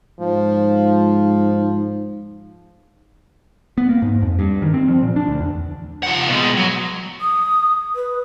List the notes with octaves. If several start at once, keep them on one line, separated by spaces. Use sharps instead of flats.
G#2 F3
B3
A#3
G#2
F2
G2
D#3
C4
F3
A#2
D4
D2
E2
F3 F#5
B2 G#3
F#3
D#6
B4